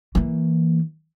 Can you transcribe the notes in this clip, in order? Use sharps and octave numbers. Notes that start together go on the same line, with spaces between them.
E3 A#3